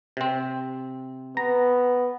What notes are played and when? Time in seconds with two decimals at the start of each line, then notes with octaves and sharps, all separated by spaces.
0.17 C3 C4
1.37 B3 A#5